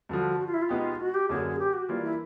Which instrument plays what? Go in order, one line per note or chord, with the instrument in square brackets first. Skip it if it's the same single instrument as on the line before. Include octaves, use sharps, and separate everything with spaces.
[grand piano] G2 D3 F3 [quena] F#4
[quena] F#4
F4
E4
F4
[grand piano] B2 G#3 B3 D#4 G4
[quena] F#4
G4
[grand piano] F#2 D3 F#3 A#3 [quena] G#4
[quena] G4
F#4
[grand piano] E3 G3 A#3 D4 [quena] F4
[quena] E4